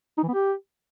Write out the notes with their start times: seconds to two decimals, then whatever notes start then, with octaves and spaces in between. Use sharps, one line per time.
0.18 D#4
0.23 E3
0.28 B3
0.34 G4